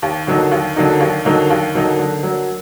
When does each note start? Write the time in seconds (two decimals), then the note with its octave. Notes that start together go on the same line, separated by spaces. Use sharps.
0.02 D#2
0.27 D3 F#3 A#3 D#4
0.51 D#2
0.76 D3 F#3 A#3 D#4
1.00 D#2
1.25 D3 F#3 A#3 D#4
1.50 D#2
1.74 D3 F#3 A#3 D#4
1.99 D3
2.23 F#3 A#3